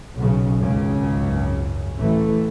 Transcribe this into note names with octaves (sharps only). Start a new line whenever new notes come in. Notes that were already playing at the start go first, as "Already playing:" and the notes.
B1 C#3
G#1 C#2 F#2 C#3
A1 E3 A3